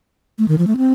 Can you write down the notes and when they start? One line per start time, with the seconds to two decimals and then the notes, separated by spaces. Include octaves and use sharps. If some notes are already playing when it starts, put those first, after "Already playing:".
0.38 A3
0.48 D#3
0.58 F3
0.67 A3
0.77 C4